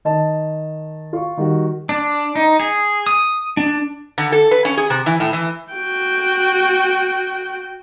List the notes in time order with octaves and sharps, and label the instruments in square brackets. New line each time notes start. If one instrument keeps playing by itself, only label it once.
[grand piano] D#3 D#5 A5
F4 C#6
D#3 G3 F#4
[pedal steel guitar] D4
D#4
G#4
D#6
D4
[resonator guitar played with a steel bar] D3
A4
B4
C#4
G#4
C3
E3
A2
E3
[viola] F#4 G5